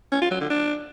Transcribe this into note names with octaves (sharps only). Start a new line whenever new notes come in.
C#4
F4
F#3
D3
D4